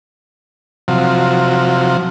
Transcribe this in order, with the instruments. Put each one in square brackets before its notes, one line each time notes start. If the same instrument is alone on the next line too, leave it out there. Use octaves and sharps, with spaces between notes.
[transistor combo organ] C3 F3 F#3